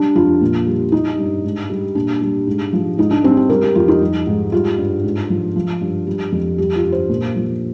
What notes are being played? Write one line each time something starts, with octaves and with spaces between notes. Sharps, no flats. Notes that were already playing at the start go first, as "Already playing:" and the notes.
Already playing: G3 D4
F2 F4
A#2
G3
G3 D#4
G2
G#2
G3
A#2 D4
G3
G#2
F3
G#2 D#4
D4
G3 C4
D4
G3 A#4
G4
F2 F4
D#4
G3
G#2
G3 F4
G2
G#2
F3
F3
G2
G3
F2
G3 G4
F4
G2
C5
A#2
F3